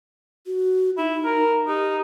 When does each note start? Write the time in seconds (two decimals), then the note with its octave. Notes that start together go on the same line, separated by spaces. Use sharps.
0.46 F#4
0.98 D#4 E4
1.24 A#4
1.68 D#4 G4